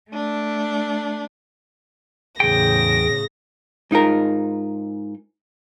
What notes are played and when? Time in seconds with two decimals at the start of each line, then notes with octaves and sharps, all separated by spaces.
0.11 A3 D4
2.40 E2 A2 C#3 G#4 G5 A#6
3.91 G#2 D#4 F4 A#4